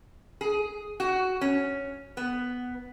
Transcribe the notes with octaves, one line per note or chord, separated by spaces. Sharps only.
G#4
F#4
C#4
B3